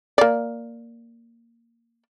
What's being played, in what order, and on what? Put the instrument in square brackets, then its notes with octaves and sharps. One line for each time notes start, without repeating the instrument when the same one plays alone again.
[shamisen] A#3 D5